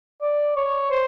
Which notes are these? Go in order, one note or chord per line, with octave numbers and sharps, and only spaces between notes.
D5
C#5
C5